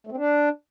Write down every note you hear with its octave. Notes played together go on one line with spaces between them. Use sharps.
A3
C4
D4